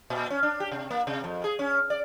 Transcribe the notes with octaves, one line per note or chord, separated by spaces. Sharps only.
A#2
C#4
D4
G4
C3
A#3
C3
F2
G#4
C#4
D5